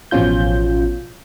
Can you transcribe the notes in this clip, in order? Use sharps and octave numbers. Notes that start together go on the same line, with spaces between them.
A1 B2 F3 C#4 F4 G6